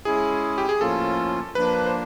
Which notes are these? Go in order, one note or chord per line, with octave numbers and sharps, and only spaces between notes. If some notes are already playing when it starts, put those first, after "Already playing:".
G#3 C#4 E4 G#4
G4
G#4
A2 F3 A#3 C#4 F4 A4
F3 A#3 D4 B4
C5